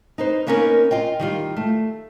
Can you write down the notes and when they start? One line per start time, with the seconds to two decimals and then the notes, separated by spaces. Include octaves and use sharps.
0.18 D#4 B4 C5
0.47 A#3 B3 C#4 D#4 G#4 A#4
0.91 F4 D#5 G5
1.20 D#3 G3 F4
1.57 A3